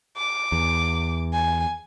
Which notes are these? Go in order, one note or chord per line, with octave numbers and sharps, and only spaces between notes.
D6
E2
G#5